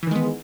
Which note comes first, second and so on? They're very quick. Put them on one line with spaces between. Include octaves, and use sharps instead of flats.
E3 D#3 G#3 B3